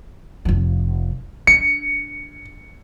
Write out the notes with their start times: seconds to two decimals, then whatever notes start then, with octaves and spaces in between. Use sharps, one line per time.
0.45 F1 F3
1.47 D4 C#7